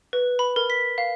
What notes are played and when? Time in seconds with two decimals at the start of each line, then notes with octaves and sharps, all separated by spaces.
0.13 B4
0.39 B5
0.56 A#4
0.70 B6
0.98 F5